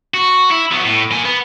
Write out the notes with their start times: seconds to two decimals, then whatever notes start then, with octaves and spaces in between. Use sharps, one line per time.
0.14 F#4
0.51 E4
0.72 F#3 B3
0.85 A2
1.11 A#3 G#5
1.25 B3